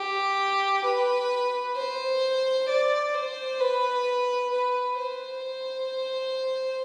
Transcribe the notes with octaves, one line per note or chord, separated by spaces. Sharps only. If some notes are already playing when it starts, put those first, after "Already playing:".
Already playing: G4
B4
C5
D5
C5
B4
B4
C5